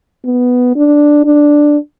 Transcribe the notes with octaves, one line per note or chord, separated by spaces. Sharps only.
B3
D4
D4